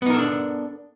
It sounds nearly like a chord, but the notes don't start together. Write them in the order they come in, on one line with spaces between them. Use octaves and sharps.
B3 D#4 A#4 A4 D4